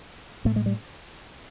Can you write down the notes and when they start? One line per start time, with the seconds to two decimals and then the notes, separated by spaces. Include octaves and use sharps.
0.45 A2 A3
0.56 G#3
0.66 G3